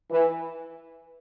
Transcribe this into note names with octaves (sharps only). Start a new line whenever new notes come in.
E3